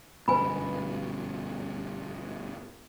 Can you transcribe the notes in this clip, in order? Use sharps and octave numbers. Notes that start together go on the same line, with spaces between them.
G1 F#2 B2 B4 G#5 B5